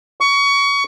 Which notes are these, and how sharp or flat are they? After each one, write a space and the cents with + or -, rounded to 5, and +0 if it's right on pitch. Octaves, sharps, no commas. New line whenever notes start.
C#6 +25